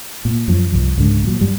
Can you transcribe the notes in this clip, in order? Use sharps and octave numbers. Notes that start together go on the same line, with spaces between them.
A#2
F#2 F3
C2 G2 F3
C#2 G#2 D3
A#2 F#3
G2 G3